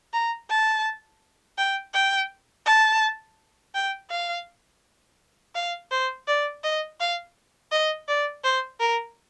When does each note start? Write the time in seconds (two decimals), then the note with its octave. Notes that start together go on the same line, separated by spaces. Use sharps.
0.13 A#5
0.50 A5
1.58 G5
1.94 G5
2.66 A5
3.74 G5
4.10 F5
5.55 F5
5.91 C5
6.28 D5
6.64 D#5
7.00 F5
7.72 D#5
8.08 D5
8.44 C5
8.80 A#4